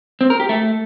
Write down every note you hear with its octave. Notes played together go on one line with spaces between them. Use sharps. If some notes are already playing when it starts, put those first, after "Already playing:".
C4
A#4
G4
A3